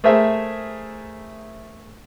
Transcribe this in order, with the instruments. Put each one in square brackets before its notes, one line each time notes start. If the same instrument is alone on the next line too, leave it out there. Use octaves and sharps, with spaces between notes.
[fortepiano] A3 G#4 A#4 C5 E5